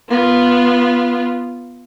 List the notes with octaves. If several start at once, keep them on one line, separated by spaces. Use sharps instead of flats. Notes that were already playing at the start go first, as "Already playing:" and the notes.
B3 F4